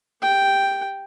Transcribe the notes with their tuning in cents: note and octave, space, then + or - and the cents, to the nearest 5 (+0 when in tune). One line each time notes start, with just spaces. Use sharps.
G4 +10 G5 +0